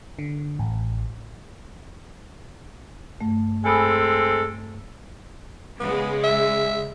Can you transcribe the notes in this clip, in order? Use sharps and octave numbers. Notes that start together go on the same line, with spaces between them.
D3
A1
G2 A3
G#3 C4 A4 G#5 B5 D#6
C#3 G#3 B3
E5